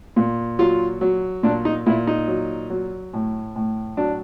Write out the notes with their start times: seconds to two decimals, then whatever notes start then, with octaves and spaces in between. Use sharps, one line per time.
0.16 A#2
0.59 F#3 F4
1.01 F#3
1.43 A#2 D4
1.65 D#4
1.86 A#2 E4
2.07 D#4
2.28 F#3
2.70 F#3
3.13 A2
3.56 A2
3.97 F#3 D4